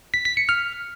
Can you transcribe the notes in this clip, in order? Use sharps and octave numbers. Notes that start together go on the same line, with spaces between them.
B6
B6
C#7
F6